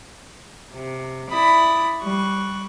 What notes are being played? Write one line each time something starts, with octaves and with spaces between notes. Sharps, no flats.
C3
E4 D5 B5 D#6
G3 C#6 F#6